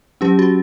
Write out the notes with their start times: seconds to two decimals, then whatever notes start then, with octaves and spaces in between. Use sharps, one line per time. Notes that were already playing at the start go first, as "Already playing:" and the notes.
0.21 F#3 C#4 G4
0.39 F#4